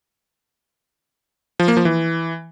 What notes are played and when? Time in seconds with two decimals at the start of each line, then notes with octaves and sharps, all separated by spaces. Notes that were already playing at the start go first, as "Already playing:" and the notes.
1.59 F3
1.68 A#3
1.77 F3
1.85 E3